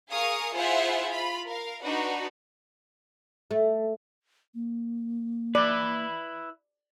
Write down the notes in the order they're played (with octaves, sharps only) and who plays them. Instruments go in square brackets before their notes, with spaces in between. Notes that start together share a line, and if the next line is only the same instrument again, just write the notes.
[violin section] G#4 A#4 F5 C#6 D#6
E4 F4 G#4 C5 E5 F#5
F4 B5
A#4 F5
D4 D#4 F#4 B4
[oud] A3
[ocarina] A#3
[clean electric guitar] E4 B4 [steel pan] D5